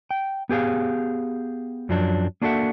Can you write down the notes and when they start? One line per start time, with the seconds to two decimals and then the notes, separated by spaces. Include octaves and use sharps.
0.11 G5
0.49 B3 G4 G#4 F5
1.89 F#2 F3 F#3 D4
2.42 A#3 D4 F#4 A4 E5 F#5